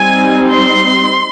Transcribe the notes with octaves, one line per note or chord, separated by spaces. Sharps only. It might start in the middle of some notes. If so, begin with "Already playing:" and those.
Already playing: G3 C4 D#4 G#5
C6